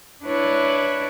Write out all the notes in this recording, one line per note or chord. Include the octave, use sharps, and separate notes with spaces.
D4 E4 B4 C#5 D5